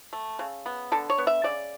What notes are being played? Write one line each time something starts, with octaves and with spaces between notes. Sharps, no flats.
A3
C#3
B3
D3 A4
C#5
B3
E5
C#3 D5